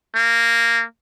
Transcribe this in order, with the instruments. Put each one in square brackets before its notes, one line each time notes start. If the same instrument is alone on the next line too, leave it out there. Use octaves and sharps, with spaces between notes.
[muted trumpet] A#3